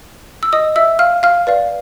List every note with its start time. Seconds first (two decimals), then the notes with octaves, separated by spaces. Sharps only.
0.43 E6
0.53 D#5 D#6
0.76 E5 E6
0.99 F5 F6
1.23 F5 F6
1.47 B4 D5 F5